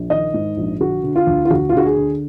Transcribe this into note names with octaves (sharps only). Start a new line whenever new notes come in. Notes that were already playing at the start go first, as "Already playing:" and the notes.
Already playing: A#1
D#3 D#5
G#2
A#1
D3 F#4
D3
F4
D2
F4
D2 F#4
F4
D3 F#4
G#4
D3